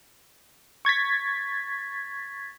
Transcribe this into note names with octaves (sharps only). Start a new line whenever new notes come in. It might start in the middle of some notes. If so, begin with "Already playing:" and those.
C#6 G#6 A6 B6